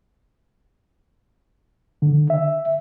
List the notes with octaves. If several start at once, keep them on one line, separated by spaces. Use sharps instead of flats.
D3
E5